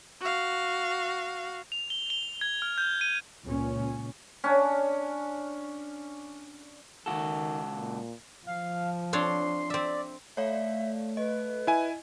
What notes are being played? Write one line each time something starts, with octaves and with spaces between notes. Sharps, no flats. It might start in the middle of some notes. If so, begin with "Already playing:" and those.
F#4 F5
F7
G7
G7
G#6
F6
G6
D#7
C#2 A#2 C#4
C#4 D4
C#2 D#3 F#4 A4
A#2
F3 F5
C4 D4 C#5 C6
C4 D5 E5
A3 C#5 D5 E5 F5
B4 D#5
E4 G#5